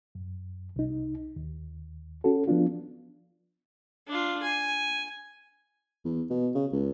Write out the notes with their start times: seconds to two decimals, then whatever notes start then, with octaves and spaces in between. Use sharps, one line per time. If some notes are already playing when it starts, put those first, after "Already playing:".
0.15 F#2
0.76 C2 D#4
1.36 D#2
2.24 C#4 F#4 A4
2.47 F3 B3 D4 F4
4.07 D4 F4
4.43 G#5
6.05 E2
6.30 B2
6.55 C#3
6.73 C#2